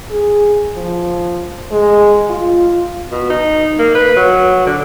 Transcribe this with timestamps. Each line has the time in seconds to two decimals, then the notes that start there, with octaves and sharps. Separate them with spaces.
0.11 G#4
0.74 F3
1.72 G#3
2.30 F4
3.11 B2
3.30 D#4
3.79 A#3
3.95 B4
4.16 F#3
4.66 D3